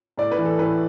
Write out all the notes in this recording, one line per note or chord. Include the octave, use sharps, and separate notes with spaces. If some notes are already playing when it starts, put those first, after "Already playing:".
A2 D5
B4
E3
A4
A2 B4